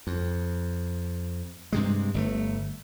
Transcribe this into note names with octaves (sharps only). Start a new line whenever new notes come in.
F2
G2 C3 G#3
G1 C#3 A3